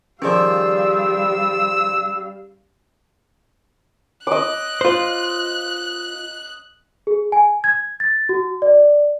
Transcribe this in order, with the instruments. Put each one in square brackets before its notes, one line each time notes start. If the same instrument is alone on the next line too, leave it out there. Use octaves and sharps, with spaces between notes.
[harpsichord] D#3 F3 [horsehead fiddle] G3 F5 [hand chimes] C#4 G#4 D5 [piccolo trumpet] E6
[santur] D#5 D6 [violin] F#6
[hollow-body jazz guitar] F4 C5
[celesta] G#4
G#5
G#6
A6
F#4
D5